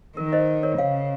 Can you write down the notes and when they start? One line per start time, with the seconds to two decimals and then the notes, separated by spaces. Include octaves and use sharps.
0.17 D#3 A#4
0.32 C5 D#5
0.63 A#4 C#5
0.78 C#3 C#5 F5